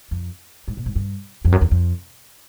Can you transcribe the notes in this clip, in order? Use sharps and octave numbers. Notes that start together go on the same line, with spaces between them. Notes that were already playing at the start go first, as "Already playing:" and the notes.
F2
G#2
A#2
G#2
G2
F2
F#2
E2
F2